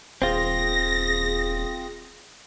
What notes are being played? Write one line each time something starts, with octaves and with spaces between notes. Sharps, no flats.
D#1 C4 F4 G#4 A#6